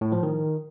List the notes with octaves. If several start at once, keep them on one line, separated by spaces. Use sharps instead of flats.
A2
F3
D#3